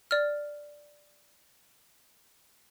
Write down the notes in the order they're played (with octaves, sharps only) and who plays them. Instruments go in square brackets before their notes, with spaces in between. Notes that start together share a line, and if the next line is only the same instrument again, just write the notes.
[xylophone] D5 F6